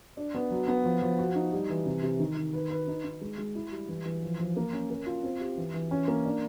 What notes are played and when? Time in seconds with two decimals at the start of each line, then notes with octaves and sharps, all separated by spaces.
0.17 D4
0.34 B3
0.51 F#3
0.68 B3
0.85 F3
1.02 F3
1.19 F#4
1.35 D#4
1.53 G3
1.70 E3
1.86 C3
2.03 C3
2.20 D#3
2.37 D#3
2.53 B4
2.70 B4
2.87 D#4
3.04 D#4
3.21 G#3
3.38 G#3
3.55 E4
3.72 G3
3.89 E3
4.06 E3
4.22 F3
4.40 F3
4.56 A#3
4.72 C#4
4.90 A#4
5.06 F4
5.23 C4
5.41 G4
5.57 E3
5.74 E3
5.91 C#4
6.08 A#3
6.25 D4